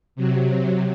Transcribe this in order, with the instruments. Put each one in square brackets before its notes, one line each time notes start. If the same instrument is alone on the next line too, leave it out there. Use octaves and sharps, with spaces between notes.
[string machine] C3 F#3